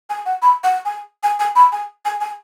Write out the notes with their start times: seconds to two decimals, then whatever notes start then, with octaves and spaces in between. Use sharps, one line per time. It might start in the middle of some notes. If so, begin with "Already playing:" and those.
0.10 G#5
0.26 F#5
0.42 B5
0.64 F#5
0.85 G#5
1.23 G#5
1.40 G#5
1.56 B5
1.72 G#5
2.05 G#5
2.21 G#5